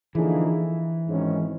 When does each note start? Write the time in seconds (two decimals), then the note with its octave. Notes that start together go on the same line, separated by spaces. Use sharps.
0.15 D3 E3 F3 A#3 D#4 G#4
1.08 G#1 G#2 D#3 G#3 C#4